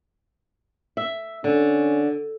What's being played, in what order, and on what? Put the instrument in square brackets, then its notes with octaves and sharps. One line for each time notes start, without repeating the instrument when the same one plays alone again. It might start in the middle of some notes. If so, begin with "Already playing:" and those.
[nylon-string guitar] E5
[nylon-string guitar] D3 [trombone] C#4